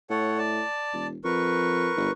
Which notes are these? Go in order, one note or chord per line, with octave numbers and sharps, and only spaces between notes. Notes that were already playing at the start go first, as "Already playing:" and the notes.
A2 A4 C#5 F#5
D5 A5
E1
F2 A#4 B4 C#6
G1